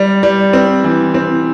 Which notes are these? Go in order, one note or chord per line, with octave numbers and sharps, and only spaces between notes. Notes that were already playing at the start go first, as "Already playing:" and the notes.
Already playing: G3
G3
C4
E3
C4